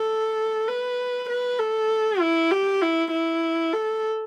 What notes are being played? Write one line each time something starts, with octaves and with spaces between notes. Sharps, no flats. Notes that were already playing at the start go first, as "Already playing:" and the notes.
Already playing: A4
B4
B4
A4
E4
G4
E4
E4
A4